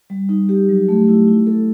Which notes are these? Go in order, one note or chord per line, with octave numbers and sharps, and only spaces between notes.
G3
D#4
G4
F#3
A3
E4
E4
A4